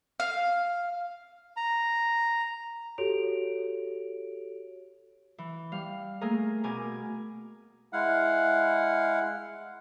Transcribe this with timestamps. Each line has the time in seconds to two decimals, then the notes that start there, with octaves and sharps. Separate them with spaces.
0.20 F5
1.57 A#5
2.98 F#4 G4 A4 C#5 D7 F7
5.38 E3
5.72 G3 F5
6.21 A3 A#3 G#4 A#4 F5
6.64 B2 A#4 G#5 D6
7.93 G#3 E4 F5 F#5